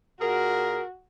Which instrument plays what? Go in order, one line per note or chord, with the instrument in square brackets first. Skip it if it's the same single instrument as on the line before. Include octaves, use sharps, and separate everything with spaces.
[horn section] A#2 G#4 A#4 [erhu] F#4